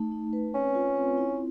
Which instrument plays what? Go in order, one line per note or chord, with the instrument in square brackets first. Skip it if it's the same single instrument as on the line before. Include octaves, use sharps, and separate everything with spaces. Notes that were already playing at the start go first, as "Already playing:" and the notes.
Already playing: [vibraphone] A3 D#4
D#4
B4
[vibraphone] C4 [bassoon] C#4
[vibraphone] F4
C4
E4